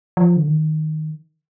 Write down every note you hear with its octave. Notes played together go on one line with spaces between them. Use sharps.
F3
D3
D#3